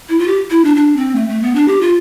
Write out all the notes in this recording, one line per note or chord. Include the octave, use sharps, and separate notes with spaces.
E4
F4
G4
E4
D4
D4
C4
A3
A3
B3
D4
G4
F4